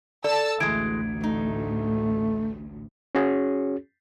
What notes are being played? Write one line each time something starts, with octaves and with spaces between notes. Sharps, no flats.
A4 D5 A5 E6
A1 D2 E3 G#3 G#6 D7
A3 D#4
C#4 F#4 G#4 C#5